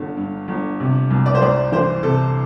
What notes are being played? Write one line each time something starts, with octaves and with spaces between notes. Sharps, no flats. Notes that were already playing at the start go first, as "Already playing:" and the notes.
Already playing: G1 G2 D3
G2
G1
C3
C2
D5
C5
C2 D5
E3 C5
C3 A4